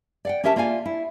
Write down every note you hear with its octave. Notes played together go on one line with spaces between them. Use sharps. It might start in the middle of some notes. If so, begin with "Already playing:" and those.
D5 F#5 G5
C#4 G4 A#4 E5 G#5 A5
A#3 F4 D5 F5 G#5
E4